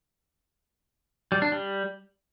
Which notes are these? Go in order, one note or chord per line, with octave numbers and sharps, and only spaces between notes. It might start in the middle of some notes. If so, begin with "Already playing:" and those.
G3
D4
G3